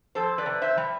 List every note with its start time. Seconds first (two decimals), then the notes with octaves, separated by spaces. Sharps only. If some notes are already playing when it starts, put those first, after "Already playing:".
0.15 F2 A4 C5
0.38 B4 D5
0.46 C3
0.61 C5 E5
0.78 G3